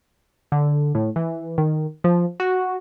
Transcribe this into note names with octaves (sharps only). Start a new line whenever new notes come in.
D3
A2
E3
D#3
F3
F#4